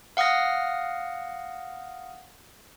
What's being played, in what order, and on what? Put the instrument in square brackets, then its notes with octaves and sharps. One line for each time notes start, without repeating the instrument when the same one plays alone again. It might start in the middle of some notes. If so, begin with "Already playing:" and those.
[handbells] F5 F#5 D#6 F6 A#6